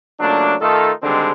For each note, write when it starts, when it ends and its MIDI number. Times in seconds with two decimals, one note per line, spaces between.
0.20 0.54 37
0.20 0.54 54
0.20 0.54 57
0.20 0.54 58
0.20 0.54 62
0.61 0.91 51
0.61 0.91 57
0.61 0.91 63
0.61 0.91 65
0.61 0.91 69
1.03 1.32 50
1.03 1.32 51
1.03 1.32 55
1.03 1.32 56
1.03 1.32 60
1.03 1.32 62